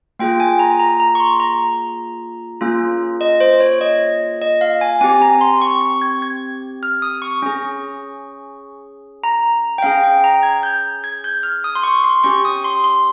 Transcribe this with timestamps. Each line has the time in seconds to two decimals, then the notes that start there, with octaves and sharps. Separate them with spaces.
0.19 A#3 F4 G#4 G5
0.40 G#5
0.59 A#5
0.79 A#5
1.00 A#5
1.15 C#6
1.20 C6
1.40 A#5
2.61 A#3 C#4 F4 G#4
3.21 D#5
3.40 C5
3.61 C#5
3.81 D#5
4.42 D#5
4.61 F5
4.81 G#5
5.01 C4 G4 G#5
5.22 A#5
5.41 C6
5.61 C#6
5.81 C#6
6.02 G#6
6.22 G#6
6.83 F6
7.02 D#6
7.22 C#6
7.42 C#4 G#4
9.24 A#5
9.78 G5
9.83 C#4 G#4 F5
10.04 G5
10.24 A#5
10.43 G#6
10.63 G6
11.04 G#6
11.24 G6
11.43 F6
11.64 D#6
11.75 C6
11.83 C#6
12.04 C6
12.24 C#4 G4 C#6
12.45 D#6
12.64 C6
12.84 C6